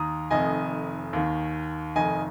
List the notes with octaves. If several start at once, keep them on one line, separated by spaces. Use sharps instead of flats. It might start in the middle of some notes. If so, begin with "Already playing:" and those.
Already playing: D#2 D#3 A#5 D#6
F1 F2 D#3 D#5 G#5
D#2 D#3
F1 F2 D#3 D#5 G#5